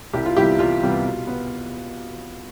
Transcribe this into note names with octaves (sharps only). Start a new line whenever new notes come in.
C2 E4 G4
F4
C3 G3 B3 E4 G4
C2 F4
C3 G3 B3
B2
B3